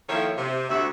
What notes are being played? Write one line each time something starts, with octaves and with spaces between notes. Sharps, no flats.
D#3 F3 A#3 E4 A4 C#5
C3
D2 F#4 E5